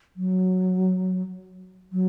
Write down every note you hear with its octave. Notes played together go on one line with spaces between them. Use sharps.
F#3
F#3